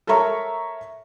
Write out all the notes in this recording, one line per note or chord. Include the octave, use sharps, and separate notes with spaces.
A4 A#4 C#5 E5 A#5 C#6